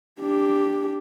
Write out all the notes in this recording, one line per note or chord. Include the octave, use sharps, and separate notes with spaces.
D4 G4